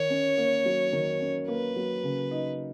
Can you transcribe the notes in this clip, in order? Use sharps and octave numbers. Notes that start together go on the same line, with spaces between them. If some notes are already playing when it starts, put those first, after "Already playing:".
Already playing: D#3 C#5
C#4
A#3
F#3
D#3
C#4
A#3 B4
F#3
C#3
D#4